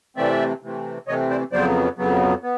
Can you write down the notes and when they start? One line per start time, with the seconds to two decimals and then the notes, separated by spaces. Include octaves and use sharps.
0.17 C3 E3 A3 C4 D5 E5
0.62 C3 E3 A3 C4
1.07 C3 E3 A3 C4 C#5 D#5
1.30 C5 D5
1.52 F2 C#3 F#3 B3 C5 D5
1.98 F2 C#3 F#3 B3
2.43 B3